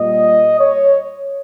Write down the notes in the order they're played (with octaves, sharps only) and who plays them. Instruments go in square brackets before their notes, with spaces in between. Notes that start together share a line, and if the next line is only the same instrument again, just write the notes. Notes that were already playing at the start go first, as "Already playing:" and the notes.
Already playing: [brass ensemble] A#2 G3 D#5
C#5